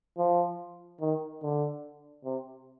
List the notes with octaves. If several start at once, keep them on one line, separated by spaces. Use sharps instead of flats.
F3
D#3
D3
C3